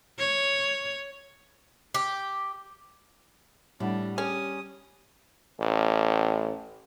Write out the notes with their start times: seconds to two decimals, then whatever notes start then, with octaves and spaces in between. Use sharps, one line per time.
0.18 C#5
1.94 G4
3.80 A2 G3 D4 F#5
4.18 C#4 G4 D#6
5.60 A1